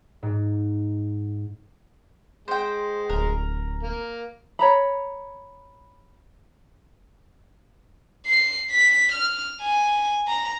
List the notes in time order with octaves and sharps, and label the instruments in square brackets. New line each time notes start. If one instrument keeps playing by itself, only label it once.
[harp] G#2
[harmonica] G#3 [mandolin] C5 G5
[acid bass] D1 [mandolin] A#4
[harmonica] A#3
[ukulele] C#5 A#5 B5
[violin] C7
B6
F6
G#5
A#5